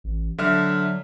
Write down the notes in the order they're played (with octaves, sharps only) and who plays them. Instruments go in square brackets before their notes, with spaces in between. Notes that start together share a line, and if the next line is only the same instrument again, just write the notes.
[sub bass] A1
[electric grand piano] D3 E5 F6 [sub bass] F#3